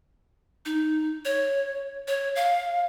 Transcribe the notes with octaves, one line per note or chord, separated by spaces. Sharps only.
D#4
C#5
C#5
F5